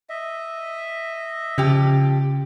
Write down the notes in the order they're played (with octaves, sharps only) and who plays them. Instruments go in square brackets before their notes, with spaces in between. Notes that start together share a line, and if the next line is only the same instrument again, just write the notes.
[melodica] D#5 E5
[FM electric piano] C#3 [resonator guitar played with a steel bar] F3 G4